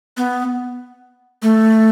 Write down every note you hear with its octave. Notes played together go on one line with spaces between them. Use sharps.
B3
A3